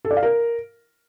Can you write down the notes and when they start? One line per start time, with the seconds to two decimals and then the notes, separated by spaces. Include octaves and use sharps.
0.05 A4
0.11 D5
0.17 F5
0.23 A#4